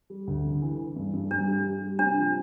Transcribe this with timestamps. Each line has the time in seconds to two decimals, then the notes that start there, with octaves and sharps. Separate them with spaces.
0.10 G3
0.27 D2
0.45 D3
0.62 E3
0.79 E3
0.96 G2
1.13 G2
1.31 G2 D4
1.48 G3
1.65 G3
1.82 G3
1.99 C3 D4
2.17 F3